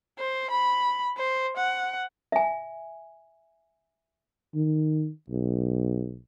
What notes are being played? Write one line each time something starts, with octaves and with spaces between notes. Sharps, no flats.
C5
B5
C5
F#5
E5 G#5
D#3
B1